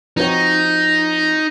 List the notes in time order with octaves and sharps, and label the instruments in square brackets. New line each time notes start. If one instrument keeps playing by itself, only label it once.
[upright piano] F3 C4 F#4 C#5 [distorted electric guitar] D#4